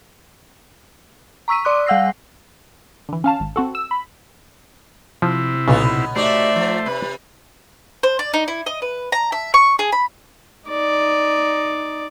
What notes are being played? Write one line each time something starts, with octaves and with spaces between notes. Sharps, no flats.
A#5 C#6 E6 B6 D#7
D5 C6 D6 F#6
G3 F5 F#5 E6 A#6 C7
D3 E3
C#4 F5 A5
G#1
C4 F#4 A4
E6
B5
C3 F3 E4
B1 A#2 C#3 B3 C#4 D#4
A3 D#4 F#4 G4 C5 D5 E5
F3
C3 B4
C5
D5
D#4
E4
D#5
B4
A#5
E5
C#6
G#4
B5
D#4 D5